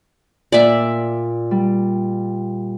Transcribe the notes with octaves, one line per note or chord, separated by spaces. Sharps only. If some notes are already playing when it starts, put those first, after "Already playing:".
A#2 D5 E5
G3